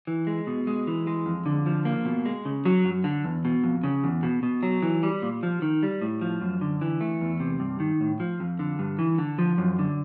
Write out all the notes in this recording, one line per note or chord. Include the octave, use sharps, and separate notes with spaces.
E3
G#3
B2
G#3
E3
G#3
F2
D3
F3
A#3
B2
G#3
C#3
F#3
F#2
D3
E2
B2
F2
C#3
E2
B2
B2
F#3
E3
G3
A#2
F3
D#3
G3
A2
F3
F#2
D3
E3
A3
E2
C3
G2
D#3
A2
F3
F2
D3
G2
E3
D3
F3
F#2
D3